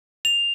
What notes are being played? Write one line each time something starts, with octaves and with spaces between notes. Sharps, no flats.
F7